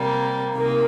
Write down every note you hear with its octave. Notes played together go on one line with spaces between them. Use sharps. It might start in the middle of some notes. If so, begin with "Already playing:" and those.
Already playing: C3 G3 A#3
C3 D#3 A#3